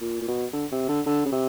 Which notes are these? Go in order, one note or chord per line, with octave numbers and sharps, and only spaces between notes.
A#2
A#2
B2
D3
C3
D3
D3
C#3
C3